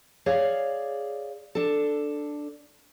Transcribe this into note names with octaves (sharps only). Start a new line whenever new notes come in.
G#4 C#5 D5 F5
D4 A4